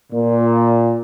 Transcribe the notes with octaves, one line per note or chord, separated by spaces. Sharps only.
A#2